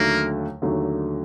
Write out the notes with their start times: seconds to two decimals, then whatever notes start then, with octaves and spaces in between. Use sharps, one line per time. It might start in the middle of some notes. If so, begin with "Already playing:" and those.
Already playing: D#2 D3 F#3 A3 A#3
0.62 D#2 D3 F#3 A3